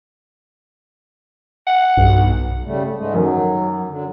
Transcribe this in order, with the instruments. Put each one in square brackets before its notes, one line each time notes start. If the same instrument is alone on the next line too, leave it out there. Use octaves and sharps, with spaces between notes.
[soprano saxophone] F#5
[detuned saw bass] B1 [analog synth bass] G2
[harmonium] C#3 G3 A3
G#2 G#3 A3
[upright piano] F#2 D#3 [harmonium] F#3
[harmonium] D3 F#3